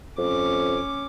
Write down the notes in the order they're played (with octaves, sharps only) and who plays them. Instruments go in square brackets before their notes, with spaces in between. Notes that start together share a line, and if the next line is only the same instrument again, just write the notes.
[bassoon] F2 [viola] C#4 D6